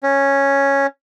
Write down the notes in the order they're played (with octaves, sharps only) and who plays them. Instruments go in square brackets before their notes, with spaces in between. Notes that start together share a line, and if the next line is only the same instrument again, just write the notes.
[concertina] C#4